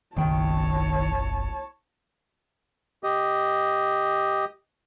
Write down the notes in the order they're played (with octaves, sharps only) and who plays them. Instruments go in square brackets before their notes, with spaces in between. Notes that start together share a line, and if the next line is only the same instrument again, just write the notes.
[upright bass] F#1 B1 [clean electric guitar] D#3 G5 [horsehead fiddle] C#5 A5
[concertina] G4 D#5